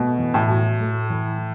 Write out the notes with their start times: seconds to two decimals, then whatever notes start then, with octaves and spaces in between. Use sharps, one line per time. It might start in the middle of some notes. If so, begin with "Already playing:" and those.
Already playing: B2 A3
0.18 E3
0.34 A2
0.49 F#4
0.80 A3
1.10 E3